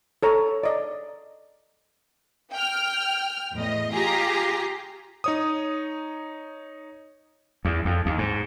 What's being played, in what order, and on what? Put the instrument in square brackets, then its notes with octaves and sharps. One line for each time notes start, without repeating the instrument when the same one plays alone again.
[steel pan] A4 C#5 A#5
D5 D#5
[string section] G5 F6
E2 A2 D#5
F4 G4 G#4 A#5 A#6 C7
[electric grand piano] D#4 C#5 D#6
[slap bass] E2
F2
D#2
G#2